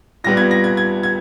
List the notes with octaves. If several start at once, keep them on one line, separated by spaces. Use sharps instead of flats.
A#2 G3 B3 A#6
G#6
A#6
G#6
G#6
G#6